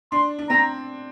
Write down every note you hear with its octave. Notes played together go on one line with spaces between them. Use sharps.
D4 C6
D4
C4 A#5